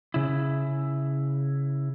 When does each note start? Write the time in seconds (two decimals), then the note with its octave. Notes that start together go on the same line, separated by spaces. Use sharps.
0.14 C#3 E4